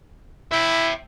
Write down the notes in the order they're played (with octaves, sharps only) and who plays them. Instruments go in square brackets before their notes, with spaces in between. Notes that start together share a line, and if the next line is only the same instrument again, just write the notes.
[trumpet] E4 [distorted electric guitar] E5 G5